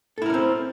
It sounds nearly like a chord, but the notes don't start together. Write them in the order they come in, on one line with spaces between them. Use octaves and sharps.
A4 E4 A#4 C#4 C4